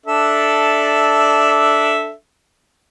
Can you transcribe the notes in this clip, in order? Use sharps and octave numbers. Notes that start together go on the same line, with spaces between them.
D4 A4 E5